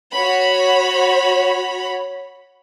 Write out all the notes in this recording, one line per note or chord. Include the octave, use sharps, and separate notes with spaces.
F#4 C#5 B5